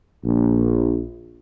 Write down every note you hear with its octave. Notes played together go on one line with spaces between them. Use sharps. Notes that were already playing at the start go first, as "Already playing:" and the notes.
A#1